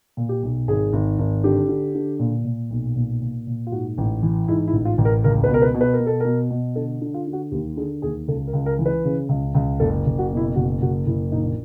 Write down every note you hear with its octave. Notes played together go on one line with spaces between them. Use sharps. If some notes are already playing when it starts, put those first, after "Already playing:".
A#2
G4
B1
G#1 G#4
G#1
G#1
D3 G4
D3
D3
A#2
A#2
B1
A#2
A#2
A#2
F4
G#2 F#4
A1
E3
G#2 E4
E4
A1
F4
A1
A#4
C#2 A#4
B4
B2 A#4
B4
B2
B4
A#4
B2
A4
B2 A#4
B2
D3 A4
D3
F4
D3
F#4
D#2 G4
D3 G#4
D#2 G#4
C#2 A4
A#4
C#2
A#4
E3
B4
C#3
C#2
C#2
F#1 A4
F#1
F#4
B2
E4
F#1 F#4
F#1 F#4
F#1 E4
A#1 D#4